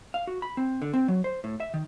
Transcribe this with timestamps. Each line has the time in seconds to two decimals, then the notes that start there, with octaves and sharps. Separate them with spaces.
0.14 F5
0.27 F#4
0.42 B5
0.57 C4
0.82 D3
0.94 C4
1.08 F#3
1.24 C5
1.44 A2
1.60 E5
1.74 D#3